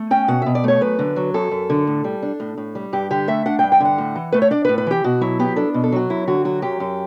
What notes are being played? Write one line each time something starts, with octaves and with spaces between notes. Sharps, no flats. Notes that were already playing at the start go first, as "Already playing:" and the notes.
Already playing: A3
C#4 G5
B2 F#5
B2 E5
D5
A3 C#5
F#2 B4
D3
F#3
F#2 A4
F#2
D3
A2
G3
D4
A2
A2
G3
G2 G4
D3 G4
A3 E5
D4 F#5
G5
G2
G5
D3 F#5
A2
E3
A3 B4
C#5
D4 D5
B4
A2
B4
E3 G4
B2 F#4
F#3 E4
B3 G4
D4 A4
B2
A4
F#3 F#4
F#2 E4
D3 F#4
F#3 F#4
F#2 G4
F#2